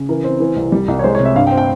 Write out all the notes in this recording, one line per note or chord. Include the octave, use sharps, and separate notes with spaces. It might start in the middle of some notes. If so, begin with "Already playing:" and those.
Already playing: C#3
E3 A#4
C4
E3
C2
G3
C2
C#5
G#3 C5
C#5
C3
E5
G2 F5
G5
C4
G5